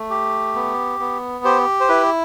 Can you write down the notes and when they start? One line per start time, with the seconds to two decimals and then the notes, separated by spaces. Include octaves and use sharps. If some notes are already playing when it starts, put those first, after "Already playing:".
Already playing: A3
0.10 G4
0.55 B3
1.00 B3
1.44 G4 C5
1.80 C5
1.89 E4 B4